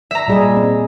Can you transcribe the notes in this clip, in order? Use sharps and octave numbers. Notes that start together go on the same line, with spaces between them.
E5 A#5
A#2 G3 G#4 D#5
C4